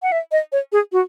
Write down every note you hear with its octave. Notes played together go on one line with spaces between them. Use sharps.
F#5
E5
D#5
C#5
G#4
F#4